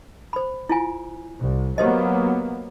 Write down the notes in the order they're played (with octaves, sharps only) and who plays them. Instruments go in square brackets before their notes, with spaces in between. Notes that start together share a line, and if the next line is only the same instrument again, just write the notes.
[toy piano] C5 B5
E4 F4 G#5
[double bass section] C2
[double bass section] F#3 A#3 B3 [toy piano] G4 C5 D#5